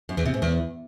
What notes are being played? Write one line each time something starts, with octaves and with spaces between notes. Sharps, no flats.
F#2
E2
C3
G#2
E2